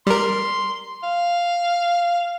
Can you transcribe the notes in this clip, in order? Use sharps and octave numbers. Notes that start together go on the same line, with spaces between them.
G3 A#4 C6
F5